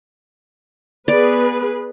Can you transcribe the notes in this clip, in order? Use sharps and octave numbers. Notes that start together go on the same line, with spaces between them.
B3 G#4 B4 D5